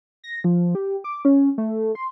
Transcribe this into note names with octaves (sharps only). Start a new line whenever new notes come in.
A#6
F3
G4
D6
C#4
A3
C6